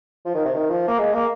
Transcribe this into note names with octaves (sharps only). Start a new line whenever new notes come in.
F3
D#3
C3
D#3
F3
A#3
G#3
A#3